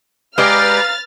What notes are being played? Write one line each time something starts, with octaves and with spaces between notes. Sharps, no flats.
G#3 G4 B4 D5 F5 A#5 F6 A6